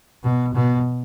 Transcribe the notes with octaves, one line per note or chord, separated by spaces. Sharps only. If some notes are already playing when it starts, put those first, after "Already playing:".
B2
B2